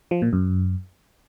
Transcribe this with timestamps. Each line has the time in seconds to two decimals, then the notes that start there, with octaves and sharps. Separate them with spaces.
0.11 F3
0.22 A#2
0.33 F#2